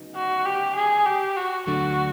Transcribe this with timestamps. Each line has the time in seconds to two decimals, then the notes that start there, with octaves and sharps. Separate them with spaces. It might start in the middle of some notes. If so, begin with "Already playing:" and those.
Already playing: D2 C#3 F#3 B3 D#4
0.15 F#4
0.46 G4
0.75 G#4
1.06 G4
1.36 F#4
1.66 D2 D3 F#3 A3 D4 F#4